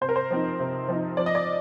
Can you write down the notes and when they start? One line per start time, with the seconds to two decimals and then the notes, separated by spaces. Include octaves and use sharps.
0.01 C3 C5
0.09 A#4
0.16 C5
0.30 F3 C4 D#4
0.60 C3
0.88 F3 C4 D#4
1.17 F3 D5
1.26 D#5
1.35 D5